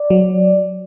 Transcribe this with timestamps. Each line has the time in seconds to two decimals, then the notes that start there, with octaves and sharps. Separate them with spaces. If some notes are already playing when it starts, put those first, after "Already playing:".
Already playing: D5
0.10 F#3